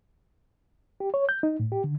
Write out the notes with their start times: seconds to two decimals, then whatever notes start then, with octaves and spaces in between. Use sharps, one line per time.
1.00 G4
1.14 C#5
1.29 G6
1.43 D#4
1.60 A2
1.72 G4
1.84 D3